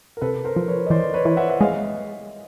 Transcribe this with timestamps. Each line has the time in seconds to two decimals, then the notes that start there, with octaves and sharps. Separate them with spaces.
0.17 A#4
0.21 C3 A4 B4
0.44 A#4 C5
0.56 F3
0.68 B4 C#5
0.86 D#5
0.90 E3 C5 D5
1.14 B4 C#5
1.25 E3
1.37 E5 F#5
1.50 E5
1.60 G#3 D#5 F5